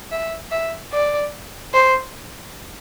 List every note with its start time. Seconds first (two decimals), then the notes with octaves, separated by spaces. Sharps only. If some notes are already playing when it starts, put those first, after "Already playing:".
0.11 E5
0.51 E5
0.92 D5
1.74 C5